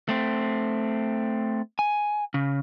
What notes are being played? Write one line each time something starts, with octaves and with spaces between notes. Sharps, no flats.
A3 C4
G#5
C#3